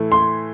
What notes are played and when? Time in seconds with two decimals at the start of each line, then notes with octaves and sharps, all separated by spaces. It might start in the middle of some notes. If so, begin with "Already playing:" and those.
Already playing: A2 E3 A3
0.12 C6